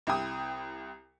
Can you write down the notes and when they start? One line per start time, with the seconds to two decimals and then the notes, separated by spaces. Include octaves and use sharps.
0.07 C2 E4 G4 G5 D#6